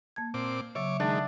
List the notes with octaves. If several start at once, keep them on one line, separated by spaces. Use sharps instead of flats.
A#3 A5 G#6
A#2 C4 D6
C#3 F#3 C#5 E5 D6
D#3 G#3 D4 F#5